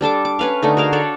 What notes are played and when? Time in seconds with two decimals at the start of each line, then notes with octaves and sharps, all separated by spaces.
0.01 G3 D4 A4 D6
0.25 D6
0.39 C#4 B4 F5
0.62 D3 A3 D#4
0.77 F#4 G#4 A#4 F5
0.93 D4 A4 C#5 D5